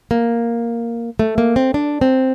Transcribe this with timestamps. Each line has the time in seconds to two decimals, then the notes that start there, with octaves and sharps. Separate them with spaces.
0.11 A#3
1.19 A3
1.38 A#3
1.56 C4
1.74 D4
2.01 C4